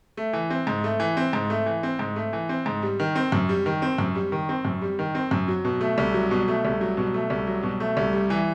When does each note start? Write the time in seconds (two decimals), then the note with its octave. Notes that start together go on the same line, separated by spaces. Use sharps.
0.17 A3
0.33 E3
0.50 C4
0.67 G#2
0.84 A3
1.00 E3
1.17 C4
1.33 G#2
1.50 A3
1.66 E3
1.83 C4
1.99 G#2
2.16 A3
2.33 E3
2.49 C4
2.66 G#2
2.82 G3
3.00 D#3
3.16 C4
3.32 F#2
3.49 G3
3.66 D#3
3.82 C4
3.98 F#2
4.15 G3
4.32 D#3
4.49 C4
4.65 F#2
4.82 G3
4.99 D#3
5.15 C4
5.31 F#2
5.48 F#3
5.65 B2
5.81 A3
5.98 C2
6.14 F#3
6.31 B2
6.48 A3
6.65 C2
6.81 F#3
6.97 B2
7.14 A3
7.30 C2
7.47 F#3
7.63 B2
7.80 A3
7.97 C2
8.13 G3
8.30 E3